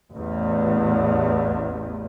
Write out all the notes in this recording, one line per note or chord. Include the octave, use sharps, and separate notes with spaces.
A1 E2